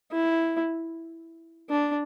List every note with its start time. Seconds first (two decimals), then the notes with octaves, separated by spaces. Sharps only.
0.12 E4
1.70 D4